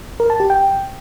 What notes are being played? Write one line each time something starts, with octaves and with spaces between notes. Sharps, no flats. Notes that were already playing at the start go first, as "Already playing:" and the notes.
A#4
A5
G4
G5